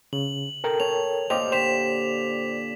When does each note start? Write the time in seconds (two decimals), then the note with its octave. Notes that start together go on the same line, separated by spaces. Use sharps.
0.13 C#3 F#7
0.64 A4 A#4 G5
0.80 C#5 A5 F7
1.30 A#2 G4 C5 D#5 F5 G5 D6 F7
1.52 D3 C5 B6 E7 F7